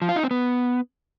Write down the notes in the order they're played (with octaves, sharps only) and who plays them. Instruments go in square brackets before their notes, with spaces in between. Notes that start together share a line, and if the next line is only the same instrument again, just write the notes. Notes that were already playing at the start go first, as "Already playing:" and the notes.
[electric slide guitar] F3
F4
D#4
C4
B3